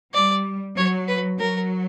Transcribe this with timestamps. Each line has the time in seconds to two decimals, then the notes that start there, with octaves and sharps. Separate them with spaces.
0.14 G3 D5
0.76 F#3 C#5
1.08 B4
1.39 F#3 A#4